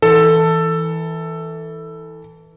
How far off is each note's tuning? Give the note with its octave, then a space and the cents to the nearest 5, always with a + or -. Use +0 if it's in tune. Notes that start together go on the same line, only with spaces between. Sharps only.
E3 -15 A4 +10